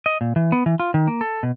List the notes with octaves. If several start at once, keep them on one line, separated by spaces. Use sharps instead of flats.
D#5
A#2
E3
B3
E3
F4
D#3
A#3
A4
B2